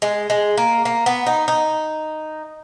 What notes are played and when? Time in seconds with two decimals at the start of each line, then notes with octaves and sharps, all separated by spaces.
0.02 G#3
0.30 G#3
0.57 A#3
0.85 A#3
1.06 B3
1.26 D#4
1.48 D#4